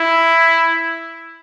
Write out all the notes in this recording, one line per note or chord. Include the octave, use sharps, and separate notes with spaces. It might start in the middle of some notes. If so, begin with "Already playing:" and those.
Already playing: E4